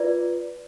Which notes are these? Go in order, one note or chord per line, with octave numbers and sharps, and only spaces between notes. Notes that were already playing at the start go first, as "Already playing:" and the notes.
Already playing: F4 B4 D5